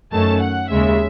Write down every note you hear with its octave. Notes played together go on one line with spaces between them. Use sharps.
F#2 D#3 A3 C#4 A5
F#5
D#2 C#3 G#3 C#4 E5